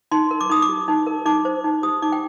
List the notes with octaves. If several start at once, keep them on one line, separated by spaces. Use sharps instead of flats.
D#4 C6
A#4
D6
D#4 D#6
D6
G4
D#4
A#4
D#4 D6
C5
D#4
G4 D#6
D#4 D6
G5